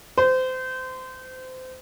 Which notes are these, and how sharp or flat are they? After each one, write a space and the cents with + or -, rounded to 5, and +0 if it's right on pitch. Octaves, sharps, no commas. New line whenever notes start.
C5 -25